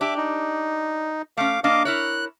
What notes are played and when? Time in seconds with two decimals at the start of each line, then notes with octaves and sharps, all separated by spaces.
0.01 D4 G4 E5 D6
0.17 D#4
1.37 A3 C#4 F5 D6
1.64 A#3 D4 D#5 F5 D6
1.85 E4 A#4 C#5 F#6